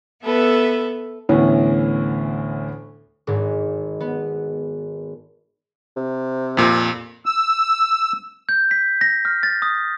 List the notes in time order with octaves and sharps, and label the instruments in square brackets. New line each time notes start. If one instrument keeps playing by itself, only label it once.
[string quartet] B3 A4 B4 E5
[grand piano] D2 A2 E3 B3 C#4
[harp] G#1 G#2
B3
[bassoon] C3
[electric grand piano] F2 A#2
[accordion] E6
[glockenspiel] G6
B6
A#6
F6
A6
D#6